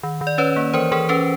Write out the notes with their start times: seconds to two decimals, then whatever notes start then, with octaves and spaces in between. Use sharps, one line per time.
0.03 D#3
0.21 D#3
0.27 D5
0.38 C#4 B4 C#5
0.56 A#3
0.73 E3 A#4 C5
0.92 E3 G#4 A#4
1.09 C#4 A4 B4